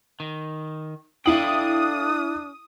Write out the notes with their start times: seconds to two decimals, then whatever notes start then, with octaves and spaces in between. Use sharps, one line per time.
0.20 D#3
1.26 D4 E4 A4 F5 G5 D#6 F#7